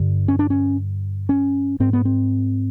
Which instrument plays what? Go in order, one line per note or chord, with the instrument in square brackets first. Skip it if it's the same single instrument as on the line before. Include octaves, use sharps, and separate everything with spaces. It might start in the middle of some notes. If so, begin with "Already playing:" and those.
Already playing: [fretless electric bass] G2 D3
C#4
D4
C#4
C#4
G#2 C4
B3
C4